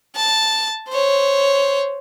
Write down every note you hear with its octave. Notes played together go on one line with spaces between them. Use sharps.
A5
C5 C#5